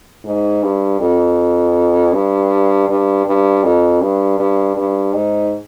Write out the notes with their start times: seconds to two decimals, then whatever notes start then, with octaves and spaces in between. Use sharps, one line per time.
0.25 G#2
0.63 G2
1.00 F2
2.13 G2
2.88 G2
3.26 G2
3.64 F2
4.01 G2
4.39 G2
4.76 G2
5.14 G#2